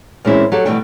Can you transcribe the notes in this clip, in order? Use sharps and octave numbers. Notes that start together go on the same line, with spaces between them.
A#2 E3 G#3 C4 C#4 E4
F#3 G4 A4
B2 E3 G3 A3 G5